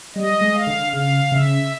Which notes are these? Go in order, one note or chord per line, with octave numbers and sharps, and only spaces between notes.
G3 D#5
G#3
F5
D3
C#3 F5
C#3 E5